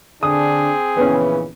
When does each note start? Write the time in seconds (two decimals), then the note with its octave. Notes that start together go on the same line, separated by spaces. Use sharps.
0.23 D3 C4 D4 G#4 D#6
0.97 A#1 C#3 E3 B3 C#4